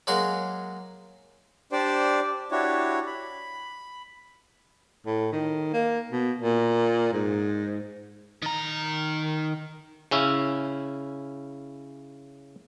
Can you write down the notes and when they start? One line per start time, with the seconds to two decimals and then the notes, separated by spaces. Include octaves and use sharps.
0.07 F#3 G#3 A#3 F#4 G#4
1.72 D4 G4 C5 D5
2.51 D4 E4 F#4 G4 C#5
3.07 B5
5.06 A2
5.32 D#3
5.74 A#3
6.12 B2
6.42 A#2
7.13 G#2
8.42 D#3 A#5
10.11 C#3 C#4 E4